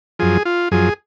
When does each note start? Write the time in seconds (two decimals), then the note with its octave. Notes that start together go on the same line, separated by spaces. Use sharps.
0.19 F#2 F3 G#4
0.45 F4
0.71 F#2 F3 G#4